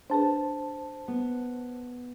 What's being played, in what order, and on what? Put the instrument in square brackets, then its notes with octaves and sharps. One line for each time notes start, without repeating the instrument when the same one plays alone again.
[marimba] D4 G#4 B4 [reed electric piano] C5 A5
[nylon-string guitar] B3